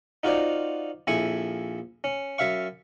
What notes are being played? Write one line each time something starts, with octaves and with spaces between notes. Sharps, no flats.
D#4 F4 F#4 C5 D5
A#1 F2 E4 G#5 C#6
C#4
F#2 E5 F5 C#6